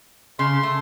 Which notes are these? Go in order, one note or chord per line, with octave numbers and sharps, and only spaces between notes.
C#3 C6
A3